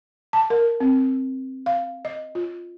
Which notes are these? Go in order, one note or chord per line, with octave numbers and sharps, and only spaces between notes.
A5
A#4
C4
F5
D#5
F4